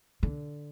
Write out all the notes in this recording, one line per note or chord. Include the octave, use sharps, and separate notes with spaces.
D3